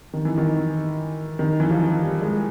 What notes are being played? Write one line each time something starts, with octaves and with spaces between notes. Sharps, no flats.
D#3
E3
D#3
D#3
E3
F3
G3
G#3